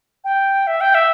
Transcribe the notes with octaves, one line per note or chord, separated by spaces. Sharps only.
G5
E5
G5
E5